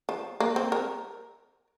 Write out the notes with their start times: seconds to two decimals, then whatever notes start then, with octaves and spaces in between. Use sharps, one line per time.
0.09 F3
0.40 A#3
0.56 C4
0.72 A#4